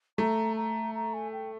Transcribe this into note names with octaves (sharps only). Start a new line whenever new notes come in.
A3 A#5
A#5
A#5
G#5
G5